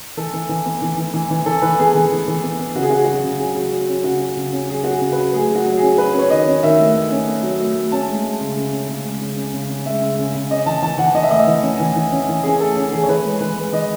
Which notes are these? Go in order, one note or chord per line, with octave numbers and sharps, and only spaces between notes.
E3 A4
E3
E3
B3
E3
E3
E3
E3
E3 A4
E3 B4
B3 G#4
E3
E3
E3
B3
B3
C#3 F#4
G#4
C#3 F#4
G#4
F#3 F#4
C#3
F#3 G#4
F#3
F#3
C#4
C#3 F#4
F#3
C#3
C#4
F#3 G#4
C#4 F#4
G#4
C#3
B4
F#3
A3 G#4
F#3 F#4
F#3
G#4
C#4
F#3 B4
C#4
C#5
D#3 D#5
C#4
D#3 E5
A3
A3
C#4
A3
F#3
A3
A3
C#4 A5
G#3
G#3
C#3
C#3
C#4
C#3
G#3
C#3
C#4
C#3
C#3
G#3 E5
C#3
C#3
C#3
C#4 D#5
E3 A5
E3 A5
E3 F#5
E3 D#5
E5
A3 D#5
E3
C#4
E3
E3
C#4
E3
C#4 G#4
A3 A4
C#4
E3 G#4
C#5
E3 B4
G#3
E3 B4
G#3
E3 D#5